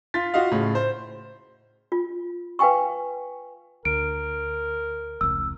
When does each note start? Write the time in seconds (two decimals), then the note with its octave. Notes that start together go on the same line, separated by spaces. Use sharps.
0.14 F4 C6 A6 B6
0.34 F4 F#4 D#5 F5
0.51 A2 C#3
0.75 C5
1.92 F4
2.59 B4 F5 G5 G#5 C#6
3.85 D2 A#4 D7
5.21 E1 C2 E6